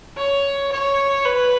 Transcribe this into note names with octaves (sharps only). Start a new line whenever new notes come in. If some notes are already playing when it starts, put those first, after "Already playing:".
C#5
C#5
B4